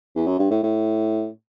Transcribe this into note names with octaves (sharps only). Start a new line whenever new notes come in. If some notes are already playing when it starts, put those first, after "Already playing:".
E2
F#2
G2
A2
A2